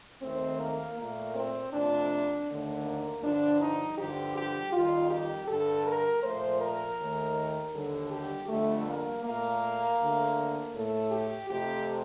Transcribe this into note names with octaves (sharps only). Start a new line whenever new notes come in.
D#2 D#3 A3 C4
A#3
A#2 A3 A#3
C4
F2 C3 F3 A3 D4
D#2 D3 A3
A#3
G2 D3 F3 D4
D#4
G2 D3 F3 G4
G4
F2 D#3 G3 F4
G4
G2 D3 G3 A4
A#4
A#2 F3 A3 C5
A#4
D#2 D#3 A3
D#2 D3 G3 A4
G4
F2 D3 G3 A3
A#3
A#2 A3 A#3
D2 D3 A3
A2 A3 A4
G4
F2 C3 F3 A3 G4